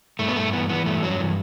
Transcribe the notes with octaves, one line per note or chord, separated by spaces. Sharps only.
G2 A3
B3
G2 A3
E3 B3
E3 B3
G2 A3
G2 F#3
E3